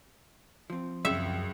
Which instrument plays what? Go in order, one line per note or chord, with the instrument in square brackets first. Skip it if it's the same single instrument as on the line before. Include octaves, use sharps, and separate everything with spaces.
[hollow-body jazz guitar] F3 C4
[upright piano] C#2 [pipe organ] F#2 [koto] E5